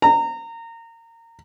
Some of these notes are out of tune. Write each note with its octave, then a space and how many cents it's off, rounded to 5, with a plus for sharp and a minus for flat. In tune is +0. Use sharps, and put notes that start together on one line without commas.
A#5 -25